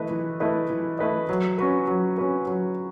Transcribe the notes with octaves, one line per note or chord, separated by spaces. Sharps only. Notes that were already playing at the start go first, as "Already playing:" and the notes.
Already playing: E3 A3 E4 B4 D#5
E3
A3 E4 B4 D#5
E3
A3 E4 B4 D#5
F#3
C#4 F#4 B4
F#3
C#4 F#4 B4
F#3